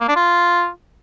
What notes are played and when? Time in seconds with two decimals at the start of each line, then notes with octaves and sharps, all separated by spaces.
0.01 A#3
0.08 D4
0.16 F4